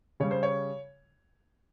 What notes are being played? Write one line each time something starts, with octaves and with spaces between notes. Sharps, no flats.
C#3 G3 C#5
C5
C#5